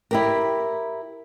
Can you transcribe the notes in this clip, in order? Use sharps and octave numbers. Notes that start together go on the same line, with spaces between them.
E4 G4 A#4